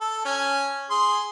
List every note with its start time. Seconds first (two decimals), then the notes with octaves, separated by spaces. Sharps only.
0.01 A4
0.25 C#4 G#5
0.91 G#4 C6